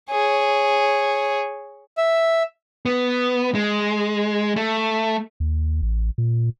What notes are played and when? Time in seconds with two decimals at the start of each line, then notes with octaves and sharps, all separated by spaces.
0.11 G#4 C#5
1.97 E5
2.86 B3
3.55 G#3
4.56 A3
5.40 D#2
5.82 A1
6.18 A#2